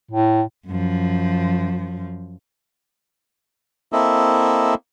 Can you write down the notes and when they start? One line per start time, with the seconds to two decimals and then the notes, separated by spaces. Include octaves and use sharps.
0.11 A2
0.67 F#2 F3
3.93 A#3 C4 E4 A4 D#5 E5